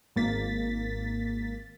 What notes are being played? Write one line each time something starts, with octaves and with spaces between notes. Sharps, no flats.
G#1 A#3 A6 B6